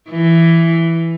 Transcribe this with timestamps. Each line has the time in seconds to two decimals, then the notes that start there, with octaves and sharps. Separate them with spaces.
0.10 E3